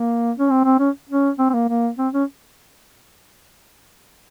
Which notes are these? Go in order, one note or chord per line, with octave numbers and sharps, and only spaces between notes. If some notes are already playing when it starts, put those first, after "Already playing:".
Already playing: A#3
C#4
C4
C4
C#4
C#4
C4
C4
A#3
A#3
C4
C#4